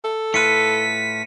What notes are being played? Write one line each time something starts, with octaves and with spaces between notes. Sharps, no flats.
A4
A2 F4 B4 B6 C#7 D#7